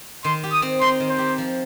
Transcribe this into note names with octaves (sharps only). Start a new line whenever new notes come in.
D#3 C6
G4
D#6
C4
D#4 C6
D#3
C5
G4
F3